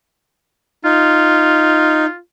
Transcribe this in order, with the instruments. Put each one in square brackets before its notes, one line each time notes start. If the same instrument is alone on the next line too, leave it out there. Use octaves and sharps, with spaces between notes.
[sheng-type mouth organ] D#4 [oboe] F4